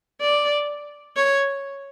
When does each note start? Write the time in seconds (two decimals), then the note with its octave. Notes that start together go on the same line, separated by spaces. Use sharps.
0.21 D5
1.16 C#5